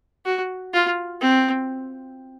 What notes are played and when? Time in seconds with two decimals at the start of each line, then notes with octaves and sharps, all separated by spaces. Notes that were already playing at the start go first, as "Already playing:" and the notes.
0.25 F#4
0.73 F4
1.21 C4